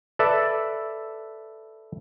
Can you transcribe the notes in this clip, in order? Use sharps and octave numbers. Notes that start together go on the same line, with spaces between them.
A4 B4 D5 E5